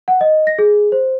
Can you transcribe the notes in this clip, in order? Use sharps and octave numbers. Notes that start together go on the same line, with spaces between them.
F#5
D#5
A#6
G#4
C5